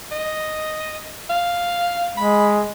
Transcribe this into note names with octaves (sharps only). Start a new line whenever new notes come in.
D#5
F5
G#3 B5